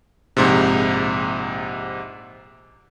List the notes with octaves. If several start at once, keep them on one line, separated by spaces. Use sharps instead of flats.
A#1 G#2 C3